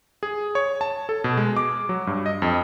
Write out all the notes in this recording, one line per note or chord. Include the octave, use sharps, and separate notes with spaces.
G#4
C#5
A5
A4
B2
G#3
D6
F#3
G2
D#5
F2